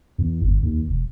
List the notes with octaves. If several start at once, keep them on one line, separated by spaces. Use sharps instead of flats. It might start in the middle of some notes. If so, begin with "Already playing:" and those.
E2
G1
D#2
E1